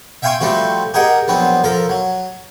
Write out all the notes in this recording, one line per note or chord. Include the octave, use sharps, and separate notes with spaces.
E5 F5 G5 G#5 C6 C#6
F3 G3 A3 C4 F#4
G4 G#4 A#4 D#5 F#5
A#1 F#3 B3 C4
F3 A4 A#4
F#3